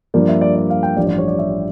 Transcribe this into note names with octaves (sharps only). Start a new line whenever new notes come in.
G2 F3 A#3 D5
E5
D5
D5
F5
G5
A1 G2 F3 D5
D5
C#5
D5
E5